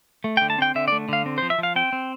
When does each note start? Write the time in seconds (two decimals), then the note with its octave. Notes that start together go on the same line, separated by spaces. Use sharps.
0.24 A3
0.37 G5
0.41 D3
0.50 A5
0.58 C4 G5
0.75 D3 E5
0.88 D5
0.92 A3
1.09 D3 F5
1.26 C4
1.38 C5
1.42 F3
1.50 E5
1.58 F3 F5
1.76 C4 G5
1.93 C4